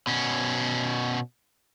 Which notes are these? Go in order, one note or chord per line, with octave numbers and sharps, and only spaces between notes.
B2 C#4